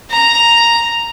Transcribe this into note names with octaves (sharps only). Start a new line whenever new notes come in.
A#5